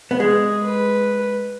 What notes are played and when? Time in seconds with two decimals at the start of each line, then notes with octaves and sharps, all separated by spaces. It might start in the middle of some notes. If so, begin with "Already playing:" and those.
0.11 B3
0.20 G#3 G#4
0.63 B4